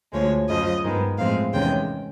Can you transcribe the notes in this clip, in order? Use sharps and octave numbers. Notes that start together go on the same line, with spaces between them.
D2 D3 F3 G#3 C#5
F#2 C#3 F3 D#5
G2 D#3 G#3 B3
A2 F3 G#3 C4 F5
E2 C3 D#3 G#3 C#4 G5